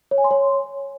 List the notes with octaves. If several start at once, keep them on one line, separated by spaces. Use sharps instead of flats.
C#5
G#5
C6
C#5